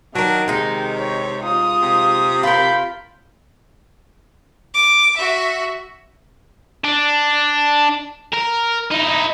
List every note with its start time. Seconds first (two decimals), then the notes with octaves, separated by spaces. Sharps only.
0.15 D#3 F#3 D4 A#4
0.48 C3 G#3 D#4
0.98 C#5
1.43 F4 D#6
1.82 C3
2.43 F4 A#4 B5 G6
4.74 D6
5.17 F#4 E5
6.84 D4
8.34 A#4
8.91 D#4 E4